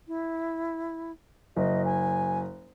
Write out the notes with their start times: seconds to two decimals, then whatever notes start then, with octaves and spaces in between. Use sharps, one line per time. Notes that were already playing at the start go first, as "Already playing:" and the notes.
0.08 E4
1.56 F#1 D#5
1.85 G#5